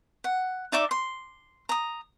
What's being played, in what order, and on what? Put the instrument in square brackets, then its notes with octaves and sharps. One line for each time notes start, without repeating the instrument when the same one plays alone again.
[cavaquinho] F#5
D#4 D5 E5 D6
C6
A#5 D#6